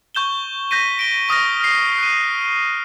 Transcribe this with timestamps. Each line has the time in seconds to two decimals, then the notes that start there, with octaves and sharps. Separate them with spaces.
0.15 C#6 G6 E7 G7
0.71 G6 A#6 B6 D#7
0.99 D7 G7
1.29 C#6 D#6 F6 A#6
1.60 F6 C7
1.98 F#6 D#7